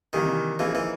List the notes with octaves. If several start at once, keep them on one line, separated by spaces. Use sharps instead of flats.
C3 D#3 E3 G3 A#3
E3 F3 A#3 D#4 G#4
E3